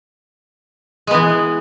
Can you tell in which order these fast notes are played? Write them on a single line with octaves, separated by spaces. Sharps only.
G#3 B3 E3